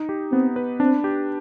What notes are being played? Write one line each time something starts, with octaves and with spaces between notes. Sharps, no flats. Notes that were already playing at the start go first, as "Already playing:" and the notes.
Already playing: D#4
G4
B3 C4
B4
C4 D4
G4